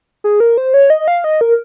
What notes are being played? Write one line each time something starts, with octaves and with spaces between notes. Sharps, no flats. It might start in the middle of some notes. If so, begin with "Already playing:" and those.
G#4
A#4
C5
C#5
D#5
F5
D#5
A#4